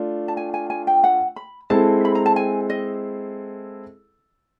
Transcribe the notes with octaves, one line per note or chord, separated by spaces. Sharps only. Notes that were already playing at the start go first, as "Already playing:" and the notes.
Already playing: A3 D4 F4
A5
G#5
G#5
G#5
G5
F#5
B5
G#3 C4 E4 A4 A5
B5
A#5
A5
G#5
D#5